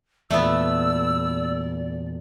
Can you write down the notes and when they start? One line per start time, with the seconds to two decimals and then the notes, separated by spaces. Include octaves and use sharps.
0.31 E2 A#2 A3 B3 D5 E6